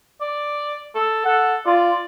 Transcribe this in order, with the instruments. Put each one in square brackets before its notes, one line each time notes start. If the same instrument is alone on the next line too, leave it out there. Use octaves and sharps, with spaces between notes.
[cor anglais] D5
A4
[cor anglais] A4 [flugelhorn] F#5
[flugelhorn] F4 [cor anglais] D5